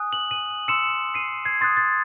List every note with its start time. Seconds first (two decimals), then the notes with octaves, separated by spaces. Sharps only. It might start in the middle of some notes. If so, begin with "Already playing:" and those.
Already playing: G#5 D#6 F#6
0.13 F#7
0.31 D#7 F#7
0.68 C6 E6 C#7 E7
1.14 C7 D#7
1.45 G#6 C7
1.61 C6 D#6 F#6 A6
1.77 A6